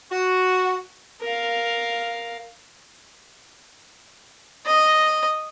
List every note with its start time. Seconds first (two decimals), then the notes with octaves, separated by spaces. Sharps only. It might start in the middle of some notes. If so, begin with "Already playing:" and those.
0.10 F#4
1.22 A#4 F5
4.66 D#5